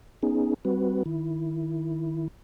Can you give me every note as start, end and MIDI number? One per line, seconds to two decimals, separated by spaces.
0.23 0.54 59
0.23 0.54 61
0.23 0.54 63
0.23 0.54 68
0.65 1.03 55
0.65 1.03 60
0.65 1.03 66
0.65 1.03 71
1.06 2.28 51
1.06 2.28 64